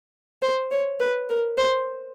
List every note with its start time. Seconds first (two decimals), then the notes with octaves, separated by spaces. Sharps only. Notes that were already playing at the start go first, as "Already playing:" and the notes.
0.42 C5
0.71 C#5
1.00 B4
1.29 A#4
1.58 C5